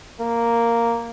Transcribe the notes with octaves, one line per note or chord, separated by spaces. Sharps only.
A#3